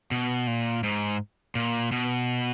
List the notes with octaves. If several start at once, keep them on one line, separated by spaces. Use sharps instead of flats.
B2
A#2
G#2
A#2
B2